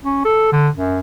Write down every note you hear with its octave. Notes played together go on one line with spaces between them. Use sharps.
C#4
A4
D3
F#2